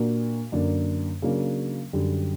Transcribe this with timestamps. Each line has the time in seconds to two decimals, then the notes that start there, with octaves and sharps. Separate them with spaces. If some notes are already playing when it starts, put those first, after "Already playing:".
Already playing: A#2 A#3 D4 F#4 A#4
0.52 F#2 D3 A#3 D4
1.22 C#3 F#3 A#3 D4
1.93 F#2 D3 G3